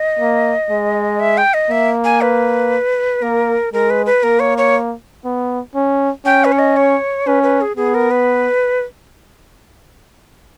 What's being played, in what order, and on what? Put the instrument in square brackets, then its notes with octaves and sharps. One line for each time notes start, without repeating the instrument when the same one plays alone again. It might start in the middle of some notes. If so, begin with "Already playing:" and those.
Already playing: [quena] D#5
[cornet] A#3
G#3
[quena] E5
G5
D#5
[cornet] A#3 [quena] E5
[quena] G#5
B4
[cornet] A#3 [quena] A#4
[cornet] G#3 [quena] A#4
[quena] B4
B4
[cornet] A#3 [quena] A#4
[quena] C#5
C#5
[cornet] B3
C#4
[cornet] C#4 [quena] G5
[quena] B4
C#5
D#5
C#5
[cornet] C#4 [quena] B4
[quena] B4
G#4
[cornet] B3 [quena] G#4
[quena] A#4
B4